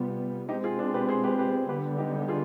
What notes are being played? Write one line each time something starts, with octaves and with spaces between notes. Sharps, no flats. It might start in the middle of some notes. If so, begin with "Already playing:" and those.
Already playing: C3 G3 B3 F4
B2 G#3 C4 D#4 G4
F4 G#4
D4 F4
G4 B4
G#4 C5
G4 B4
G4 B4
D3 G3 B3 G4 B4
D#4 G4
F4 G#4